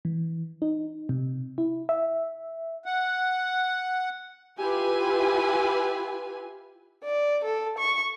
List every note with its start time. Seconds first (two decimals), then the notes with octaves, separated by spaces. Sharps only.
0.05 E3
0.62 D#4
1.09 C3
1.58 E4
1.89 E5
2.86 F#5
4.59 E4 F4 G4 B4 G#5
7.04 D5
7.45 A4
7.78 C#6